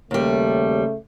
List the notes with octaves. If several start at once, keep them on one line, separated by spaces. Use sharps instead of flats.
D#2 C#3 G3 A3